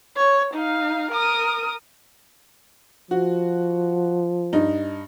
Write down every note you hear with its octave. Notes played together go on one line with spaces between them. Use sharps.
C#5
D#4 F5
A#4 D#6
F3 F#4
G2 D#4